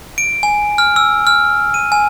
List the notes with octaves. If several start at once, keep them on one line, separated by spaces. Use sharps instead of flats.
D7
G#5
F6
E6
F6
D#7
G#5